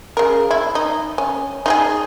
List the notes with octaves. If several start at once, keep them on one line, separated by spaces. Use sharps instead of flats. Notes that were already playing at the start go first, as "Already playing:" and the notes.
C#3 A#4
E4
D#4
C#4
D#4 F4 G#4